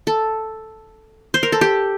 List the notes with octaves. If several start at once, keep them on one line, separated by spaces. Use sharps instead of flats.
A4
C5
A#4
A4
G4